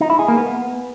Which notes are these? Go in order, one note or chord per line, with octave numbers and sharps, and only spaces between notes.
D#4
E4
G#4
A#3
B3